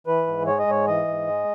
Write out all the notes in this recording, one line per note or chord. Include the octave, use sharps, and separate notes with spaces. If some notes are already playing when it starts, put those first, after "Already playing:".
E3 B4
G#2
G#3 C#5
D#5
G#2 C#5
E3 D#5
G#2
G#3